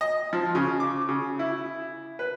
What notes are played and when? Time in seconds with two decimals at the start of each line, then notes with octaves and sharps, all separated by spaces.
0.01 D#5
0.33 F3
0.55 C#3
0.80 D6
1.09 C#3
1.39 E4
2.19 B4